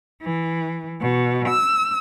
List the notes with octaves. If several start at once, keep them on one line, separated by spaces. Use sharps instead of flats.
E3
B2
E6